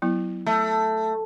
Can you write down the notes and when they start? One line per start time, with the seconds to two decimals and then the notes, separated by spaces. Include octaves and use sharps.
0.02 F#3 B3 E4
0.46 A3